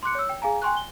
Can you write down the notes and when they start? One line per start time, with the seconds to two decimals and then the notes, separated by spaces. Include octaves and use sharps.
0.03 C6 D6 F#6 C#7
0.15 C#5 E6
0.29 G5
0.42 G#4 F5 G#5 A#5
0.62 G5 G#5 C6 C#6 F#6
0.77 G7